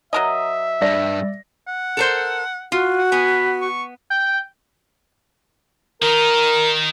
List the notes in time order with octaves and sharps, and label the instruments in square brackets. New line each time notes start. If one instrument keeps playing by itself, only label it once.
[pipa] F#3 A#4 D#5 [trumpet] E5
[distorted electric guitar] G2 [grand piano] D5 A#6
[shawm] F#5
[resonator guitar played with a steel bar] A4 A#4 C5
[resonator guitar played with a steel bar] F4 [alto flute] F#4
[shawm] F#5
[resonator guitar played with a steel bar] B3 G#5 [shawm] B5
[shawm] C#6
[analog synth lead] G5
[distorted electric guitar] D#3 D#4 [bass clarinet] A#4